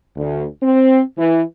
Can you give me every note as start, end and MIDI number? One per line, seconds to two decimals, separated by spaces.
0.17 0.45 38
0.62 1.02 60
1.17 1.41 52